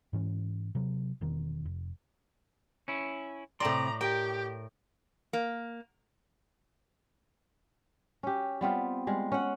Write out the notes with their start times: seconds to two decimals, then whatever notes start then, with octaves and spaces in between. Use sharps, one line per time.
0.13 G#2 E3 C#4
0.75 C3 F#3
1.21 E1 E2 D#3
1.65 F1
2.88 C#4 E4
3.60 A2 C3 D5 G5 A#5 C6
4.01 G4 A#4 G5
5.33 A#3
8.23 C#4 G4
8.61 G3 B3 C4 F4
9.07 G3 G#3 F4
9.32 C#4 F#5